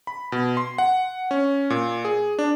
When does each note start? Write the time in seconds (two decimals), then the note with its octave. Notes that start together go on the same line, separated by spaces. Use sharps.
0.07 B5
0.32 B2
0.57 C6
0.78 F#5
1.31 C#4
1.70 A#2
2.05 G#4
2.39 D4